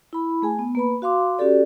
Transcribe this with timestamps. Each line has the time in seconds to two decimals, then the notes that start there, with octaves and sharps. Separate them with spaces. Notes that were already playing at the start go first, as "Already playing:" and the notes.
0.13 E4 B5
0.42 A3 G#4 G#5
0.59 B3
0.75 A#3 B4 B5
1.02 F#4 F5 C6 D6
1.39 C#4 F#4 G4 A4 D5